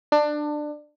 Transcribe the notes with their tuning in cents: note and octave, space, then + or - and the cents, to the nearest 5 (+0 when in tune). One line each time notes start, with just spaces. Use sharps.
D4 +20